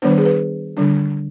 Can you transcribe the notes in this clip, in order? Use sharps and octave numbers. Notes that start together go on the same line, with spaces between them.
D#3 G3 B3 D4 C5
B4
G#4
B4
D3 G3 D4